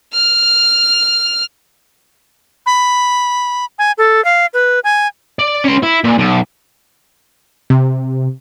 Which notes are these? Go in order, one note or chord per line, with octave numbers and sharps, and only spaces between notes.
F6
B5
G#5
A4
F5
B4
G#5
D5
C#4 C6
E4
A#2
B1
C3